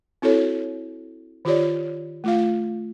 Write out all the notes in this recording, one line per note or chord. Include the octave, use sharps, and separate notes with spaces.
C4 E4 F#4 A4 C#5
D#3 F4 G4 C#5 D5
A3 F4 F5